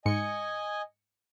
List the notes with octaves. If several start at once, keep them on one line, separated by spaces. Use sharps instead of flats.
G#2 D#5 G#5 C#7